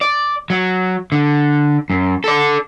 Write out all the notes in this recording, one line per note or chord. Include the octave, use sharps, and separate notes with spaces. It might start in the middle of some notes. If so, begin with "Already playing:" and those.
D5
F#3
D3
F#2
A4 D5